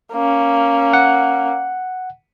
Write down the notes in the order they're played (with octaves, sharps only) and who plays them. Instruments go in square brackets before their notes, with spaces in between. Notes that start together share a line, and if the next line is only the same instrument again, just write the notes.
[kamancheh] A#3 C#4
[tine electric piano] F#5